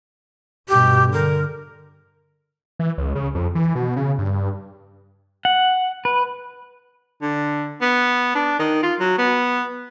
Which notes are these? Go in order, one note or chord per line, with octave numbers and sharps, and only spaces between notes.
G2 B2 G4
D3 A#4
E3
C#2
C#3
F2
E3
B2
C#3
G2
F#5
B4
D3
B3
D4
D#3
F4
F#3
B3